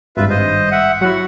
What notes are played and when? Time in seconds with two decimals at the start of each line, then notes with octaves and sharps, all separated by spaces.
0.17 G#1 G2 F4 B4 E5
0.30 C5 D#5
0.72 E5 F#5
1.01 F#3 E4 F#4 F#5